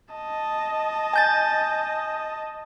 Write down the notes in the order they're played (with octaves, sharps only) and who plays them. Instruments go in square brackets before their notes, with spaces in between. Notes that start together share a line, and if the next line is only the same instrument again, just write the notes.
[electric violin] D#5 A5
[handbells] G#5 G6 A6